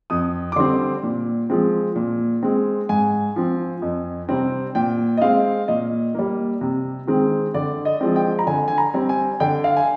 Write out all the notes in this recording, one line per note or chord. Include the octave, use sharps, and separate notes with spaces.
F2 D#6
D6
D3 G3 C4 C6
A#2
F3 G#3 C4
A#2
G#3 C4
G#2 G#5
F3 C4
F2
C3 G3 C4
A#2 G5
D#5
G#3 C4 F5
A#2 D#5
G3 A#3
C3
D#3 G#3 C4
D3 D5
D#5
F3 G#3 C4
G5
A#5
D3 G#5
G#5
A#5
G3 C4
G#5
D3 G5
F5
G#5